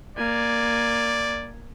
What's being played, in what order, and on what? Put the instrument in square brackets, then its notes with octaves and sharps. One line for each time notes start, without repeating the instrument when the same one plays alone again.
[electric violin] A#3 G#5 [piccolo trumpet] D5